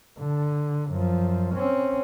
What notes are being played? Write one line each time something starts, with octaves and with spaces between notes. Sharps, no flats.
D3
F#2 F3
C4 C#4